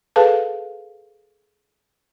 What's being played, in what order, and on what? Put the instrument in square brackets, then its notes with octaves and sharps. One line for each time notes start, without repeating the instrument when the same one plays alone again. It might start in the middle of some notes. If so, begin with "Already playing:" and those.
[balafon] G#4 A4 B4 F5 A5